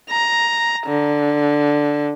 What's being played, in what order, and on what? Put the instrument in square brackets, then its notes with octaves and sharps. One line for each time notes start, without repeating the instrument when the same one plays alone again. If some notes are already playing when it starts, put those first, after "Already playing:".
[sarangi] A#5
D3